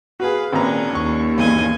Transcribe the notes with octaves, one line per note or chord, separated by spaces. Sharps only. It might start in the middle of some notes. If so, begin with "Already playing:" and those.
F#4 G#4 B4 F5
G#1 A#2 C#4 D4 A#5
D#2 C#6
E2 G2 A#2 D#5 G#5